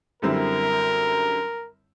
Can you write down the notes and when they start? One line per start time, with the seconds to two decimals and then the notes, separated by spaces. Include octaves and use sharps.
0.22 F#2 D3 G3 C4 E4 A#4